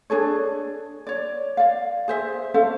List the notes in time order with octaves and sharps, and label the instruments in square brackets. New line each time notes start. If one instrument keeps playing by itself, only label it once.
[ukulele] D4 G#4 A4 C#5
C#5 D5
D5 F5
G#4 C5 E5
C#4 A4 C5 F5